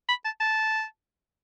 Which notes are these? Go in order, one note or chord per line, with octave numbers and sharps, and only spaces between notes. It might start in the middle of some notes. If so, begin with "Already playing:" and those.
B5
A5
A5